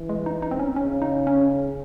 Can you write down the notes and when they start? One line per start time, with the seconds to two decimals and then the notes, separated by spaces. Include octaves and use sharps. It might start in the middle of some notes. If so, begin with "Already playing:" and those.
Already playing: E3
0.09 G#3
0.26 D#4
0.42 D#4
0.51 C4
0.59 C#4
0.76 C#3 C#4
1.02 D#4
1.27 C#4